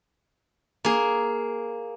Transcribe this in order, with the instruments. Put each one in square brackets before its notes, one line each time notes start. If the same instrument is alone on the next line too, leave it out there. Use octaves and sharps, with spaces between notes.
[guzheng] A#3 G#4